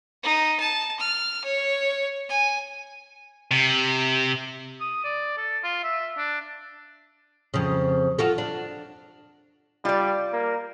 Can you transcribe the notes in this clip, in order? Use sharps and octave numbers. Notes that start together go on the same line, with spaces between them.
D#4
A5
F6
C#5
G#5
C3
D#6
D5
A4
F4
E5
D4
F2 C#3
F4 F#4 A4
D4
G3 F4 D5
A#3